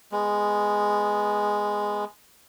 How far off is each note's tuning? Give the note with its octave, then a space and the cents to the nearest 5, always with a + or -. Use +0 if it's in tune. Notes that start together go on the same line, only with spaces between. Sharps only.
G#3 +0 B3 +0